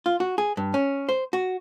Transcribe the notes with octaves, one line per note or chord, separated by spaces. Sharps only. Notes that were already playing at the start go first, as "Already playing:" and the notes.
F4
F#4
G#4
G2
C#4
C5
F#4